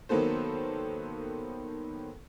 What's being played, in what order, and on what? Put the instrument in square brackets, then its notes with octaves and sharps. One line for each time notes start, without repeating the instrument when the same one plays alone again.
[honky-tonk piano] D#3 F#3 A#3 B3 A4 C5